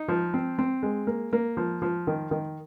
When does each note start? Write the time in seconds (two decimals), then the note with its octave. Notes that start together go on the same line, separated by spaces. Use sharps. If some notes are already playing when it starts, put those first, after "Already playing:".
Already playing: D#4
0.08 F3
0.34 C4
0.58 C4
0.83 G#3
1.07 A#3
1.33 A#3
1.57 F3
1.82 F3
2.07 D#3
2.31 D#3